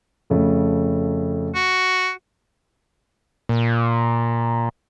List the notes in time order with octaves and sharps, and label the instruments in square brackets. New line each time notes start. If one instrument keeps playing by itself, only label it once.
[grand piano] F2 C#3 A3
[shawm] F#4
[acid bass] A#2